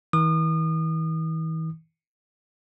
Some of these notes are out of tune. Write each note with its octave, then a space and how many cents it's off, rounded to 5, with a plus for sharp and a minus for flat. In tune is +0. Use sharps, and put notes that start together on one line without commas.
E3 -45 D#6 -35